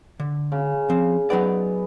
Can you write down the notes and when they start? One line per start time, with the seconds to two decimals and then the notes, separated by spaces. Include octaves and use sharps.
0.20 D3
0.52 C#3
0.90 F3 C4
1.30 F#3 B3 D#4 D5